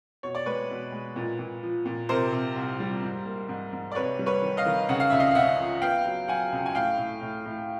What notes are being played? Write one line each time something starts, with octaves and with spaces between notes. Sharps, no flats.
B2 C#5
D5
G#3 B4 C#5
B2
G#3
A#2
A#2
F3
A#2
C3 A#4 C5
C3
C2
G3
G#2
A#3
G#2
G#2
D5
C3 B4 C#5
G3
B4 C#5
D#3
D#5 F5
D#3
C#3 F#5
F5
C#2 E5
D#5 F5
F5
C#3 E5 F#5
F3
B3 F5 G5
F#3
F#3 F#5 G#5
C#2
G#5
A2 F5 G5
A2
A2
A2